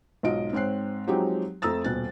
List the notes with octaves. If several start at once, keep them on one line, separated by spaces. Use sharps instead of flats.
B1 G#2 F#3 F4 D#5 D7
G#2 C4 C#5 F#6 C7
F3 F#3 G#3 C4 D#4 G4
F2 A3 A#5 D#6 E6 A6
D#1 B2 F#6 A6